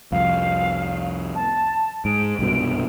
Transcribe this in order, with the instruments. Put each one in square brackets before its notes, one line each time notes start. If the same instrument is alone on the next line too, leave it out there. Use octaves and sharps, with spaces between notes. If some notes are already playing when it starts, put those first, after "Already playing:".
[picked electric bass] C2 F2 [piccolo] F5
[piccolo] A5
[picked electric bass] G#2 [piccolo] D7
[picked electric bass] C2 G2 B2